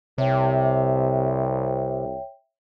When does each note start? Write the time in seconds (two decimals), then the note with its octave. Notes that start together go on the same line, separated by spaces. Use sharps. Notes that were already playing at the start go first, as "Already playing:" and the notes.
0.18 C2 C3 C#5 E5 G5